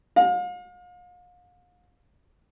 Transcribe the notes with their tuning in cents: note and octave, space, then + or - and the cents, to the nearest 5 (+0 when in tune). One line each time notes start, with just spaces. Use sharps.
F5 +40